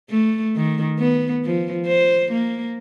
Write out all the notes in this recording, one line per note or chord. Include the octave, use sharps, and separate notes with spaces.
A3
D#3
B3
F3
C5
A#3